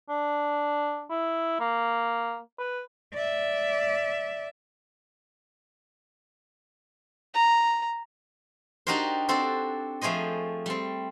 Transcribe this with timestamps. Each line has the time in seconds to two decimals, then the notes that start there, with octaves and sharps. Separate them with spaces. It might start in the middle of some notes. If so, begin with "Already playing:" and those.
0.09 D4
1.10 E4
1.60 A#3
2.59 B4
3.14 D5 E5
7.34 A#5
8.87 D4 D#4 F#4 G4 A#4 C5
9.29 C4 D4 F#4 A4 C5
10.01 F3 A3 G#4 C5 D#5
10.66 G3 C4